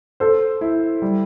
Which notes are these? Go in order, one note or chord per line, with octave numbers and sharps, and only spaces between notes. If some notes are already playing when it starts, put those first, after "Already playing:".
A4 C5
E4
G3